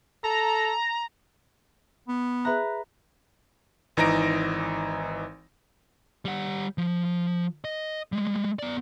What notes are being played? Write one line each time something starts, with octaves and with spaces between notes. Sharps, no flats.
A4 A#5
B3
G#4 B4 E5 A#5 F#6
G#1 E3 D#4 A#5 A#6 D7
G3 F#5
F3
D#5
G3 G#3
B3 D5